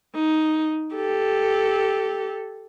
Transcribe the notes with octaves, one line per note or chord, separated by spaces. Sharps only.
D#4
G4 A4